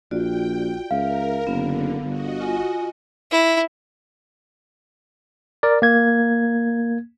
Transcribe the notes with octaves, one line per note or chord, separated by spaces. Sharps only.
A#1 F4 F#4 D5 G5
C#2 A#4 E5 F5
F#1 D3 B3
G1 F#4 D#5
F4 G#5
E4
A#4 D5
A#3 G#6